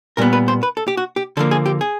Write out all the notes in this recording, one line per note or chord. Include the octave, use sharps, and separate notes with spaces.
A#2 G3 B3 A#4
B4
C5
B4
A4
G4
F#4
G4
D3 F3 A#3 A4
G#4
G4
G#4